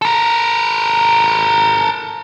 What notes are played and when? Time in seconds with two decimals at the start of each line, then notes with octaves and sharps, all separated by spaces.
0.02 A4 A#4